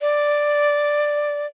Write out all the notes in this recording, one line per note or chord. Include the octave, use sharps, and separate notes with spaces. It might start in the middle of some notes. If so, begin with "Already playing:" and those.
D5